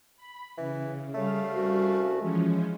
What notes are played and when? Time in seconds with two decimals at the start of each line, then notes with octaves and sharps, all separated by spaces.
0.17 B5
0.58 C#3 E3
1.14 C#3 G3 A3 F5
1.52 C2 C#4 F#4
2.21 E3 F3 G#3 C#4